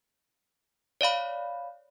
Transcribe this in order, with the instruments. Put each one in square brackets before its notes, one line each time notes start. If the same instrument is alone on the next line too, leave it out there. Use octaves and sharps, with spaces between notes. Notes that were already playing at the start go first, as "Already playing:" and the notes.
[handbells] C#5 D5 F5 B5